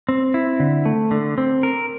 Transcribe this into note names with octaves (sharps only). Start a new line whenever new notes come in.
C4
E4
D3
A3
D3
C4
A#4